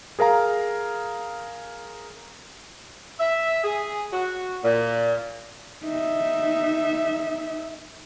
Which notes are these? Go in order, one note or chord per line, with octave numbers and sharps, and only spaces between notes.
G#4 A#4 F5 A#5
E5
G#4
F#4
A#2
D#4 E5